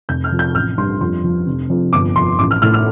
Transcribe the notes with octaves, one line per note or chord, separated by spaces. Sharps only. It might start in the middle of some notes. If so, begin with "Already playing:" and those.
F1 G6
F6
F2
G6
A1 F6
G2 C6
F2 C6
F3
F1
F2
G1 D6
F2 C6
A1 D6
F6
A2 F6
F6